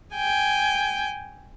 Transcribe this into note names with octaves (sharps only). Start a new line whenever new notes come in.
G5 G#5